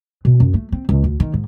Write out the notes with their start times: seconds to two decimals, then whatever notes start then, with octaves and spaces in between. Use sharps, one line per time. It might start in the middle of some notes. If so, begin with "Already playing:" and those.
0.25 B2
0.40 F#2
0.54 A3
0.72 C4
0.89 C#2
1.04 D2
1.20 D#3
1.34 G#2